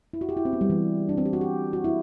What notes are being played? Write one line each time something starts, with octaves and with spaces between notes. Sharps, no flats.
E4
F#4
G4
E4
C4
B3
G3
E3
D4
C4
G4
F#4
G4
F#4
E4